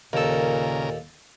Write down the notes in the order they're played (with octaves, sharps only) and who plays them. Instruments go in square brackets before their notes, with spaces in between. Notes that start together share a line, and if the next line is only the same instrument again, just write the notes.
[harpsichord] D#2 A4 [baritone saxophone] A#2 [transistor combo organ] C#3 A#4